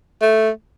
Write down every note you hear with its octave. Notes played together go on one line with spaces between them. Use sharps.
A3